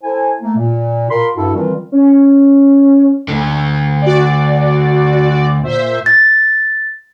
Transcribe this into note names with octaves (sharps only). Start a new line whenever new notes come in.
E4 A4 C5 G#5
A3 A#3
A#2
F4 A#4 B5 C6
G2 E4 F#4 A4
D#3 E3 G3 C4 F4
C#4
D2 D3
F#4 D5
A#2 C5 E5
A6